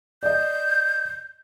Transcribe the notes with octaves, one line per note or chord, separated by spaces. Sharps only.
D5 D#5 G6